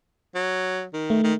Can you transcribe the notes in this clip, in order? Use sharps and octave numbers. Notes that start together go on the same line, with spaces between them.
F#3
D#3
A3
D#3